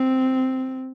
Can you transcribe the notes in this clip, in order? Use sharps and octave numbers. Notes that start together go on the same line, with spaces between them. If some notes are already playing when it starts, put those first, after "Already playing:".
Already playing: C4